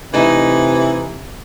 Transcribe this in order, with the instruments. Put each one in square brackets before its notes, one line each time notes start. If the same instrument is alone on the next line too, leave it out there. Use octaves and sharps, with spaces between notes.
[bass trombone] C3 [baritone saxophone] E3 [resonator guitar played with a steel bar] A3 D#4